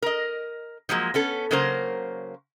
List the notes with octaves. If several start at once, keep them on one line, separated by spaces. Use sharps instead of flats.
A#4 D#5
F3 F#3 G#3 A#3
B3 C#4 A4
C#3 F#3 A#3 A#4 C5